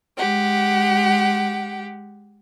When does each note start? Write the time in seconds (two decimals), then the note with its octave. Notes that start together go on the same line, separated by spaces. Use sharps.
0.18 G#3 G4 F#5